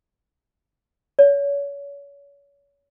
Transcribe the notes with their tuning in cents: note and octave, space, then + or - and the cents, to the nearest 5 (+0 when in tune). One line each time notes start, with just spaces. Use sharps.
C#5 +35